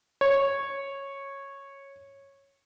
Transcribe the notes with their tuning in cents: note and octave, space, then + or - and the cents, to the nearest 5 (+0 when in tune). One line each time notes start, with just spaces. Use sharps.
C#5 -10